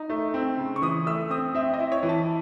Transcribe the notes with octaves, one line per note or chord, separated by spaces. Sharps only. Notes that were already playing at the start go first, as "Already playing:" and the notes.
Already playing: D#4
A3
C4
C#3
C#6
E3 D#6
A3 E6
C4 D#6
C4 E5
D#5
E4
C#5
E3
A5